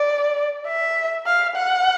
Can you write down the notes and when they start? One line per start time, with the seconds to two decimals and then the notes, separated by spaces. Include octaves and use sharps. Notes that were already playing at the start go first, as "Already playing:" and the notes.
Already playing: D5
0.67 E5
1.26 F5
1.56 F#5